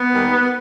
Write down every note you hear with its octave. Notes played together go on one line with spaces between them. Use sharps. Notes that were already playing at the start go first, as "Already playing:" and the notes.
Already playing: B3
D#2 D#3 G3